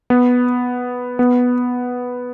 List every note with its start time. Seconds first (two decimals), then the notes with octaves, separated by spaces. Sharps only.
0.10 B3
1.19 B3